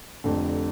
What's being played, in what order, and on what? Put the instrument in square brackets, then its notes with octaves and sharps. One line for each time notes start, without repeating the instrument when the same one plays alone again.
[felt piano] F1 F2 D3